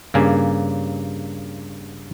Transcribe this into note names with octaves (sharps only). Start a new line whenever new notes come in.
G2 C#3 A#3 G#5